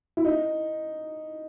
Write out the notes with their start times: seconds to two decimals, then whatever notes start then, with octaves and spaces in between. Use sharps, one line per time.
0.17 E4
0.25 D#4